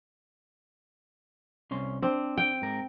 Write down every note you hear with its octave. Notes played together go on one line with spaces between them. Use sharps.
C2 C#4 C6
C4 D4
G5
G#2 A#4